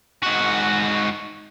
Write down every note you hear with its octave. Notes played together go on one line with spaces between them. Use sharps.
G#2 F#4